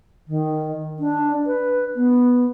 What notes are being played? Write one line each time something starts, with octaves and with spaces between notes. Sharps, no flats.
D#3
D4
B4
B3